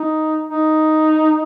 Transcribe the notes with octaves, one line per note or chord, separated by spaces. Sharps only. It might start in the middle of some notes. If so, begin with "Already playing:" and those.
Already playing: D#4
D#4